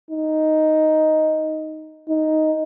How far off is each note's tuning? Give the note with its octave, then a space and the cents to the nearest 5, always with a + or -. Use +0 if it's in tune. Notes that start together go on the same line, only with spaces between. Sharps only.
D#4 +5
D#4 +5